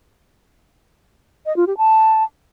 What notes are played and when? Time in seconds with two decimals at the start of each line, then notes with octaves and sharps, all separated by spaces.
1.46 D#5
1.56 F4
1.67 G4
1.77 A5